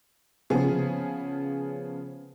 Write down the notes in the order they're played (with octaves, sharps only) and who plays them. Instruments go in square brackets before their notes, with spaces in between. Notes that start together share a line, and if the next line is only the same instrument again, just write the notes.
[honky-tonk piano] C#3 F3 B3 G#4